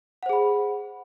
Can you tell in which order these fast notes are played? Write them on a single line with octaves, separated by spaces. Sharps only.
F#5 C5 G#4 B5